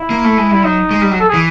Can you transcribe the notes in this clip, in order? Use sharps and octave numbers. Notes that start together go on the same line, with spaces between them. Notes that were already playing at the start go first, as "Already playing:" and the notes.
Already playing: E4
A#3
A3
G#3
G3 E4
F#3 D#4
G#3
G3
F#3
A4
G#4
E3